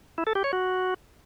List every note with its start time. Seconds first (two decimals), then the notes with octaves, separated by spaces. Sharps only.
0.18 E4
0.27 A4
0.35 G4
0.44 C#5
0.53 F#4